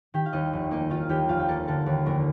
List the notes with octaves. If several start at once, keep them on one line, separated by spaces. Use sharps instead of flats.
D#3 G4 G5
F5
D#2 D#4 D#5
F1
A#3 D#4 D#5
D#3 F4 F5
D#2 G4 G5
F1 F4 F5
G5
A#3 A4 A5
D3 A4 A5
D#2
F1 A#3 A#4